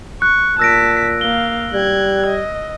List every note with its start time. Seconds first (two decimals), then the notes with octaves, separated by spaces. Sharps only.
0.22 C#6 F#6
0.59 A#2 A5 E6 A#6 B6 D7
1.21 A#3 F5 G7
1.73 G3 F#6 G#6
2.27 D#5